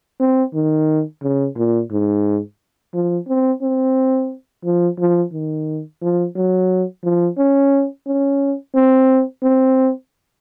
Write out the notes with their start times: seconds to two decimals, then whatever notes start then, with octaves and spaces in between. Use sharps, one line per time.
0.20 C4
0.54 D#3
1.23 C#3
1.57 A#2
1.91 G#2
2.94 F3
3.28 C4
3.62 C4
4.64 F3
4.99 F3
5.33 D#3
6.02 F3
6.35 F#3
7.04 F3
7.38 C#4
8.07 C#4
8.75 C4
9.43 C4